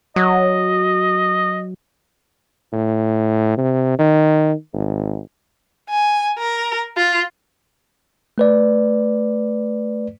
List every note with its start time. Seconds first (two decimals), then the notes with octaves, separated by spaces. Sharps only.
0.16 F#3 D#5
2.72 A2
3.57 C3
3.99 D#3
4.73 G#1
5.89 G#5
6.38 A#4
6.97 F4
8.38 A3 B4 D5